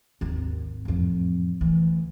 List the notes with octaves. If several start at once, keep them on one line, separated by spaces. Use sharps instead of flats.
G#1 D#2
A1 F2
D2 E3